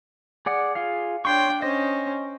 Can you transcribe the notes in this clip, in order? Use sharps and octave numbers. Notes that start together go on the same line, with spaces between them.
G#4 D5 F#5
F4 G#4 F5
D4 C#5 G5 C6 C#6
C#4 C5 D#5